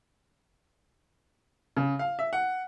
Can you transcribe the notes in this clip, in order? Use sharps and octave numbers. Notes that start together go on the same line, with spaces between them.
C#3
F5
E5
F#5